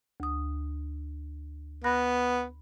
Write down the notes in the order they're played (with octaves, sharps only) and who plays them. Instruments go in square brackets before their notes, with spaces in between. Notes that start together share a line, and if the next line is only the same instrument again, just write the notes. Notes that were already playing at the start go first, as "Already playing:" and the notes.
[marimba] D2 D#6
[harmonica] B3 [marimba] B5 F#6 A#6